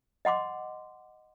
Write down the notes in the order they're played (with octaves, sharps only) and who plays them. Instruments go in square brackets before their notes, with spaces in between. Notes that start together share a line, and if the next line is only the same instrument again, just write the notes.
[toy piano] D#5 F#5 C6 D6